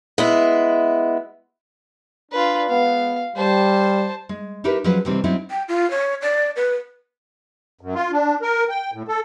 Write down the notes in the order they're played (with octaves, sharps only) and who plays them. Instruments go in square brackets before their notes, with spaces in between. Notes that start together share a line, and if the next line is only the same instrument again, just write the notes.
[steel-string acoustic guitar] G#3 B3 E4
[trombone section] D4 [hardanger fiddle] F4 B4
[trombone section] G#3 B3 [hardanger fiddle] F5
[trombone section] G3 [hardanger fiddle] C5 A5
[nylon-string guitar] G#3
D#4 E4 G4 A#4 B4
F3 F#3 G#3 C#4 F4 B4
C3 D#3 E3 G3 C4
F#3 C4 C#4 D#4 E4
[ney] G5
F4
C#5
D5
B4
[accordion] F#2
F4
D4
A#4
G5
A2
A4